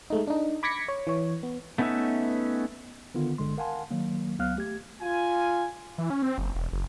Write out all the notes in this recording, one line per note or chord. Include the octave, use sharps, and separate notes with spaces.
G#3 A3 D#4
D4 D#4
B5 D6 G#6 A#6 B6 C#7
C#5
E3 C#5
B3
A3 B3 C#4 D#4 B4 E5
D3 D#3 B3 F4
G1 D3 G#3 C6
A#4 F5 F#5 G#5 A5 C6
D#3 F#3 A#3
C#2 F#3 B3 F5 F6 F#6
A3 G4 G#6
F4 G#5
E3
C#4
C4
F#1
E1
F#1